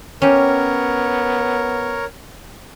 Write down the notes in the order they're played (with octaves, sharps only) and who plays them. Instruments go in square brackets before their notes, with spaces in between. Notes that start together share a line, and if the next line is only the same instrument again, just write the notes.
[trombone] B3 [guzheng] C#4 G4 [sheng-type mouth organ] A#4 C#5